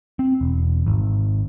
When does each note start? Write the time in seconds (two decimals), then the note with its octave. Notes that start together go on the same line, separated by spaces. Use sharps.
0.19 C4
0.41 E1
0.86 G#1